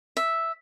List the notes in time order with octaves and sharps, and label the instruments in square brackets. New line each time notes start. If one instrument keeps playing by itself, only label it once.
[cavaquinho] E5